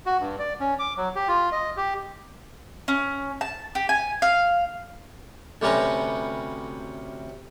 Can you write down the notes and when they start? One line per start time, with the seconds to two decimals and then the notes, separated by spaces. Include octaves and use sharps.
0.06 F#4
0.20 G2
0.39 D5
0.60 C#4
0.79 D6
0.97 F#3
1.16 G4
1.28 F4
1.52 D#5
1.77 G4
2.88 C#4
3.41 A5
3.75 G4
3.89 G#5
4.22 F5
5.62 D2 C3 G3 C#4 B4 A#5